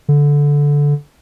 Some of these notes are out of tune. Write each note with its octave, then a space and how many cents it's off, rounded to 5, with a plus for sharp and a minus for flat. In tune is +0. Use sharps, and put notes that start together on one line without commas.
D3 -15